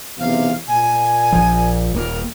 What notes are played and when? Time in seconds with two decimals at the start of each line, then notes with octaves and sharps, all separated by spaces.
0.19 B1 E2 C3 F5
0.67 A#2 G#5
1.32 A#1 F3
1.94 D#1 A#3 A#4